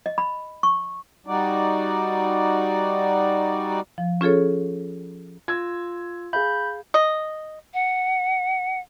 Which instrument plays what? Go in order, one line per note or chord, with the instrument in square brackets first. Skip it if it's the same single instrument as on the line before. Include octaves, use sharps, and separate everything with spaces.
[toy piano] D#5
B5
C#6
[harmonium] G3 D#4 F#4 D5
[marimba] F3
C#4 F4 G#4 A4 C#5
[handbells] F4 E6 [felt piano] G#6
[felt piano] G#4 F5 [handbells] B5 G6
[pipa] D#5
[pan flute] F#5